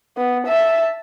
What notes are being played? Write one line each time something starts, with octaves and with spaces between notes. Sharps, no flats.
B3
E5 A5